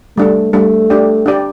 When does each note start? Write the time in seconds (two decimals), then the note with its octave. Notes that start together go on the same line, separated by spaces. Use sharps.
0.17 G3 A3 D4 A4
0.53 G3 A3 D4 A4
0.90 D4 G4 D5 G5
1.26 D4 G4 D5 G5